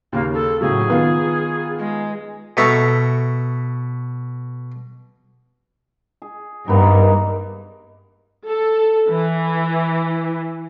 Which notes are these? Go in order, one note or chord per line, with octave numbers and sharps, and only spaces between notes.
D#2 C#3 A#3
A4
A2 C#3 F#3 G#4
D#3 B3 F4
G#3
B2 A4 E5 A#5 C#6
G#4
G2 D#3 A#3 B3
A4
E3